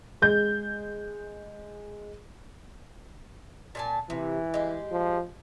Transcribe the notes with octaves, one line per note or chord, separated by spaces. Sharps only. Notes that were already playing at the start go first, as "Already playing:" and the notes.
G#3 G6
A#2 G#5 A5
C3 E3
G#3 G4
F3